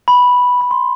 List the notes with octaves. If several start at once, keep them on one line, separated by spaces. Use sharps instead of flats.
B5
B5
C6